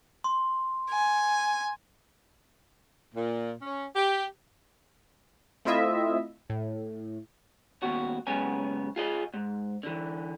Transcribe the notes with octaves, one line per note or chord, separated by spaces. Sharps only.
C6
G#5
A#2
C#4
G4
A3 C4 E4 F4 D#5 E5
A2
D#2 B2 F#4
C#2 F#2 C#3 B3 G#5
F4 G#4 D#5
G#2
D3 E3